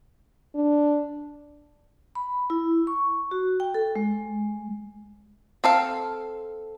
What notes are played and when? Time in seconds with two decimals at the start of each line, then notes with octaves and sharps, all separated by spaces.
0.55 D4
2.15 B5
2.50 E4
2.87 C#6
3.31 F#4
3.60 G5
3.75 A4
3.96 G#3
5.64 C4 A4 F5